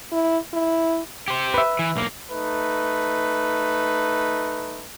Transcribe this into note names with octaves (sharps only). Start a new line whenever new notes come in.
E4
E4
G4 C5
B4 E5
E3
B1 A#3
A3 D#4 B4